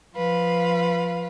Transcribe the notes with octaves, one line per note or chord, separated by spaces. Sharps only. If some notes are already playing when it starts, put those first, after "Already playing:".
F3 B4 F5